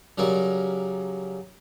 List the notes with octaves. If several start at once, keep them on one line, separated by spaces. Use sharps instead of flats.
C#3 F#3 G3 A#4